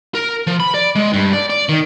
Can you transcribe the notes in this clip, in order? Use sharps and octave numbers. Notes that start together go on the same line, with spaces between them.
A#4
F3
B5
D5
G#3
G2
D5
D5
D#3